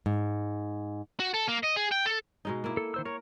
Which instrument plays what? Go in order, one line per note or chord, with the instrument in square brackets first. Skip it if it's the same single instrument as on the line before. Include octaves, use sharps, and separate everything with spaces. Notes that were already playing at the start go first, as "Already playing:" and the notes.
[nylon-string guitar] G#2
[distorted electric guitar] F#4
A4
A#3
D#5
G#4
G5
A4
[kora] B2 G#3 D#4
A#3 E4
[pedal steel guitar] A4
D#3 C5 E6
[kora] A#4 [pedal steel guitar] C#5